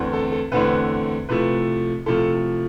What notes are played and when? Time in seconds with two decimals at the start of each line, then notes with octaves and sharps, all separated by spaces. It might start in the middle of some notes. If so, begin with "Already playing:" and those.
Already playing: E2 D3 A3 C4 E4
0.13 A4
0.32 A4
0.52 E2 D3 A3 C4 E4 B4
1.29 C3 F3 A3 E4 B4
2.06 C3 F3 A3 E4 A4